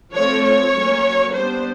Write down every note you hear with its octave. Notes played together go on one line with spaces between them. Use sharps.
F3 A3 C4 C#5
C#5
F#3 A#3 C#4
G3 B3 D4 C5